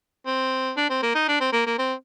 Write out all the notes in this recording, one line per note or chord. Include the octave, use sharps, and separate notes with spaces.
C4
D4
C4
A#3
D#4
D4
C4
A#3
A#3
C4